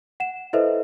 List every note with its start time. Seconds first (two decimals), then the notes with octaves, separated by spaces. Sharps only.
0.20 F#5 E7
0.53 E4 A4 B4 C5 D#5 E5